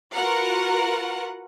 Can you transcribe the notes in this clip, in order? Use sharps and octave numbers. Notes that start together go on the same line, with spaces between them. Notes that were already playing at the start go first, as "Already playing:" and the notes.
F4 F#4 A#4 B4 F#5